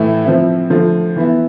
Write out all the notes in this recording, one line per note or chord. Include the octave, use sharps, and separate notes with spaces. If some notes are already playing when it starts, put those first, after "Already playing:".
Already playing: A2 E3 A3 E4
F3 C4 E4
D3 F3 A3
E3 B3 E4